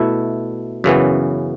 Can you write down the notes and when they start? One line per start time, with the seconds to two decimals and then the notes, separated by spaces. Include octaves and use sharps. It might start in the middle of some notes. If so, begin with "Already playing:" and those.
Already playing: B2 A3 E4
0.84 F#2 C#3 E3 B3